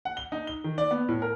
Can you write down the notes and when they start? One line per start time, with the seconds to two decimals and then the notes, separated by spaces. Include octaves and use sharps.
0.05 F#5
0.17 G7
0.32 D#4
0.47 G7
0.64 D#3
0.78 D5
0.91 B3
1.09 A2
1.22 A#4